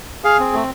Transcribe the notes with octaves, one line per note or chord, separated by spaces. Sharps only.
G#4 F5
C4
A3